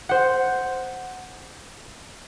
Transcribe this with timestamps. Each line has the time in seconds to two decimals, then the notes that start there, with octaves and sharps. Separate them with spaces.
0.09 C5 F#5